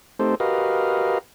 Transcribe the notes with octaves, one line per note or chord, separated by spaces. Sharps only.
A3 C4 D#4 G4 A4 C5
F#4 G4 A#4 B4 D#5 F5